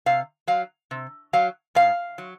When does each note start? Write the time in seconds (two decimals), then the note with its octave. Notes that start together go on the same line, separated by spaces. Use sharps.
0.06 C3 F5
0.48 F#3 F5
0.91 C3
1.33 F#3 F5
1.75 G#2 F5
2.18 F#3